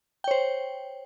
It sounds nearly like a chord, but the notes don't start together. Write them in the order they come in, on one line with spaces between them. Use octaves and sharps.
G5 C#5 C5